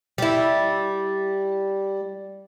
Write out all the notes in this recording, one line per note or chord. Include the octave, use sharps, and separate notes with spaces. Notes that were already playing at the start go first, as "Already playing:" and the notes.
G3 E4